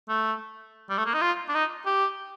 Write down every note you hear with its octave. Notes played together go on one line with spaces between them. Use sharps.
A3
G3
A3
A#3
D#4
F4
D4
D#4
G4